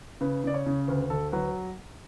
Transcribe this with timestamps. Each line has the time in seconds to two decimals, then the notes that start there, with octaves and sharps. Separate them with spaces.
0.21 C#3 B4
0.44 C#3 D5
0.54 C#5
0.66 C#3
0.88 D2 B4
1.10 D2 A4
1.32 F#3 B4